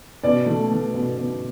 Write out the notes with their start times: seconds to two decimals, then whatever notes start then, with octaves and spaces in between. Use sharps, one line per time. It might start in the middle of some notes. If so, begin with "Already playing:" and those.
0.24 B2 D5
0.46 A3
0.70 A3
0.94 B2
1.17 B2